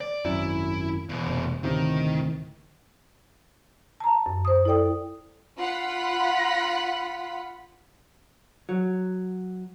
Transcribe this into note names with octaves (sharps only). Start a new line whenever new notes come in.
D5
G#1 F#2 E4
E2 B2
F1
D2 A2 C3 D#3
A5 A#5
F#2
C5 D#6
E4 A4 D5 G5 D#6
F4 F#5 B5 B6
F#3